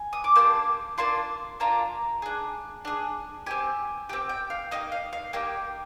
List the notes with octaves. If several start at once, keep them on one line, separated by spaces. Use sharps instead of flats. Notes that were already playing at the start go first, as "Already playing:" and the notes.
Already playing: G#5
D#6
D6
A#3 D4 G4 C6
A#3 D4 F4 C6
A#3 D4 F4 A#5
D4 G#4
D4 G#4
C4 G4 G#5
C4 G4 G5
G5
F5
A#3 D#4 G4 D#5
F5
F5
A#3 D#4 G4 G5